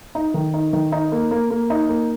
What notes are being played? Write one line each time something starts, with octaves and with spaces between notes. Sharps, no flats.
D#4
D#3
D#4
D#3
D#4
A#3
A#3
A#3
D#4
A#3